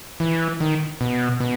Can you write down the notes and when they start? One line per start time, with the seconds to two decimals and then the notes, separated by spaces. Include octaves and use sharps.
0.20 E3
0.60 D#3
1.01 B2
1.40 B2